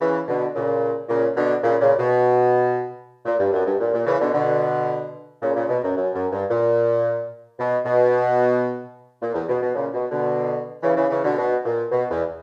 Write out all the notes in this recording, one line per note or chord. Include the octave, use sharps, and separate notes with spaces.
C#3 E3
B2 D3
A#2 C#3
A#2 C#3
B2 D3
A#2 C#3
A#2 C#3
B2
A#2
G2
F#2
G2
A#2
A#2
C#3 E3
B2 D3
B2 D3
A#2 C#3
A#2 C#3
B2
F#2
F#2
F#2
G2
A#2
B2
B2
A#2
E2
B2
B2
A#2 C#3
B2
B2 D3
C#3 E3
C#3 E3
C#3 E3
B2 D3
B2
A#2
B2
E2